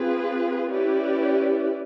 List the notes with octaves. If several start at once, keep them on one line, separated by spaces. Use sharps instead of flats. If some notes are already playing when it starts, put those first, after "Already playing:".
Already playing: C4 F4 G#4 B4
C#4 E4 G4 B4 D5